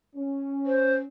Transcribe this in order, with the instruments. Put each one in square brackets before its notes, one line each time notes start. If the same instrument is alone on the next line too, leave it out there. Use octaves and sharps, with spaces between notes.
[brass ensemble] C#4
[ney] C5